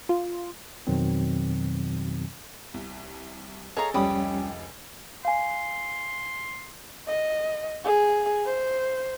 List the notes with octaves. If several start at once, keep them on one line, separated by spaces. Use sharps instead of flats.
F4
F2 B2 D#3 F#3 C4
C2
G#4 A4 C#5 D#5 F5 A#5
F1 C#2 G3 C#4 G4 G#5 B5 D#6
F5 G#5 C6
D#5
G#4
C5